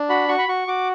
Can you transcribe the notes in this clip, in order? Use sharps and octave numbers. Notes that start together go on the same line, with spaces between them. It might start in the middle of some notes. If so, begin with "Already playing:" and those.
Already playing: D4
F#4 B5
F#4 C#6
B5
F#4 C#6
F#4 D6